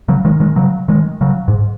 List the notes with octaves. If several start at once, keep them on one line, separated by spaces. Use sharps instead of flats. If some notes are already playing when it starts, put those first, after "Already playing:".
C#3 F#3
D#3 G#3
D#3 G#3
C#3 F#3
D#3 G#3
C#3 F#3
G#2